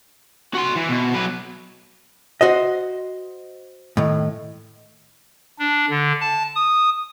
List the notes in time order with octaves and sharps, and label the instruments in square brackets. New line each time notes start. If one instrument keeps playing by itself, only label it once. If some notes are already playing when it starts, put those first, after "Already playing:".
[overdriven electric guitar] F#4 C6
E3
B2
F#3 B4
[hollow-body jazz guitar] F#4 C5 D#5
A2 D#3
[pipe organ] D4
D3
A5
D#6